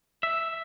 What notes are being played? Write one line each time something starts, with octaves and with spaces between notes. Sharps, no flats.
E5